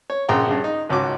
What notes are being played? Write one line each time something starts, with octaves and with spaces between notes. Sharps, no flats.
C#5
A#1 C#3 F#5 G5 A#5 C6
G2 C#3
D#4
G#1 C#2 C#4 F#4 D6